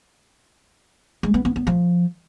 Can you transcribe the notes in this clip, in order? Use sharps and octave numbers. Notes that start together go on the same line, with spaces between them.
G#3
B3
B3
B3
F3